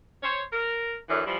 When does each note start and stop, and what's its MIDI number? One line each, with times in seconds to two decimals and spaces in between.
0.22 0.42 72
0.22 0.42 73
0.52 0.95 70
1.09 1.21 42
1.09 1.21 50
1.09 1.21 52
1.26 1.37 52
1.26 1.37 53
1.26 1.37 55